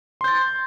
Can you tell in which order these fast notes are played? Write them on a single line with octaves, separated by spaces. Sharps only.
C6 G6 A6